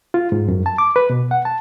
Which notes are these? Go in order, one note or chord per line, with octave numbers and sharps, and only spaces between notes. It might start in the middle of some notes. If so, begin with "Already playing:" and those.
F4
G#2
F#2
A5
D6
B4
B2
F#5
A5